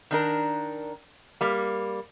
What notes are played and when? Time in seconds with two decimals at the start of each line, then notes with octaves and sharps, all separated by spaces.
0.11 D#3 D4 A#4
1.41 G3 A#3